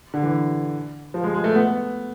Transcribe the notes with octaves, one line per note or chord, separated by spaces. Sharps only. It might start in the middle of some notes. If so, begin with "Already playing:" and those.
D3
E3
F3
G#3
G#3
A3
B3